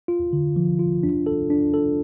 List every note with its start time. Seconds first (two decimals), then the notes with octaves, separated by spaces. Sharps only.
0.08 F4
0.33 D3
0.56 F3
0.79 F4
1.03 D4
1.26 A4
1.50 D4
1.74 A4